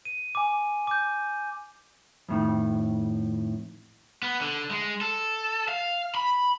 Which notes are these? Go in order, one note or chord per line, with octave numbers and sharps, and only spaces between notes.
D#7
G#5 D6
D6 G6
F2 A2 D#3
B3
D3
G#3
A4
F5
B5